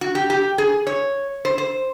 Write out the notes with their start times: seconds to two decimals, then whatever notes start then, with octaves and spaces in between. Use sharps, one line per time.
0.01 F#4
0.15 G4
0.30 G4
0.58 G#4
0.87 C#5
1.45 C5
1.58 C5